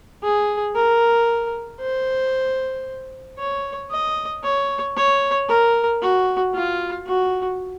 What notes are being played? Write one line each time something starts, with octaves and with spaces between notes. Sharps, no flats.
G#4
A#4
C5
C#5
D#5
C#5
C#5
A#4
F#4
F4
F#4